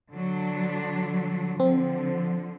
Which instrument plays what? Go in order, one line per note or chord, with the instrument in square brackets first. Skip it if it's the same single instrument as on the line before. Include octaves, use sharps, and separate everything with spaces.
[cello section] D3 F#3 D4
[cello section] D3 F3 [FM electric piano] C4